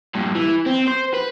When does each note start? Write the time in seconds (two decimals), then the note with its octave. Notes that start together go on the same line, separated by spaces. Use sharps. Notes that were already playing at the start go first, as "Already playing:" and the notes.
0.15 G2 A#2
0.35 E3
0.66 C4
0.87 C5
1.14 B4